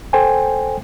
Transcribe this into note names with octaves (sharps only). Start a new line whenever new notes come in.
A4 C5 G5 G#5